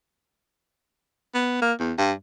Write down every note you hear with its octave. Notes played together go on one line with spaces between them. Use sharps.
B3
A#3
E2
G2